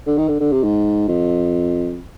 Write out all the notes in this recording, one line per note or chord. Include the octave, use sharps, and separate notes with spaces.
D3
D#3
D3
D3
C3
G#2
F2